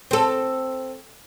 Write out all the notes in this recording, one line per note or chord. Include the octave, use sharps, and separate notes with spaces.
C4 A4